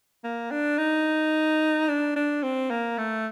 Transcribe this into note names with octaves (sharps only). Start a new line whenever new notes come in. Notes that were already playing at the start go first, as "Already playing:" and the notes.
A#3
D4
D#4
D4
D4
C4
A#3
A3